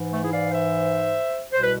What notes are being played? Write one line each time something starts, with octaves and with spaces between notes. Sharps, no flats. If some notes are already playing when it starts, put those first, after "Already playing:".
Already playing: G#2 E3
A3
E4 G#4
D5 F5
C5 E5
C2 B2 C5
B4